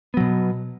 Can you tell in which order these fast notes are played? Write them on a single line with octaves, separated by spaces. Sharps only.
B3 F#3 B2